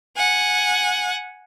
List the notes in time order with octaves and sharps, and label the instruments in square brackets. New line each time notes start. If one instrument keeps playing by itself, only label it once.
[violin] F#5 G#5